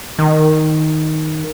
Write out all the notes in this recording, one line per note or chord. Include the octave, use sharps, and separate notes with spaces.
D#3